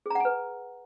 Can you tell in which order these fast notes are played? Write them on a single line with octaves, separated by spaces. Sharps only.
G#4 A#5 F#5 G#5 B4